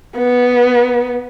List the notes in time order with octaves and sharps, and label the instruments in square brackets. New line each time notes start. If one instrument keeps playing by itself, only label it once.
[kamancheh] B3